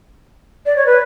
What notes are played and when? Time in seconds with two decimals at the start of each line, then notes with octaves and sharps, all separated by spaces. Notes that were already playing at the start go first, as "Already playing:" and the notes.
0.66 D5
0.76 C#5
0.86 B4